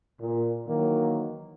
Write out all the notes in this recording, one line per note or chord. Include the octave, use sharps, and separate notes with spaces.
A#2
D#3 E3 F#3 A#3